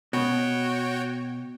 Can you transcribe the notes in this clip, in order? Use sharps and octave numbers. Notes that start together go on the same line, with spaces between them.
B2 F#4 C#5 G5